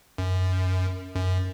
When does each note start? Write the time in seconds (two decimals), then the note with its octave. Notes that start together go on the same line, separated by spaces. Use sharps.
0.18 F#2
1.15 F#2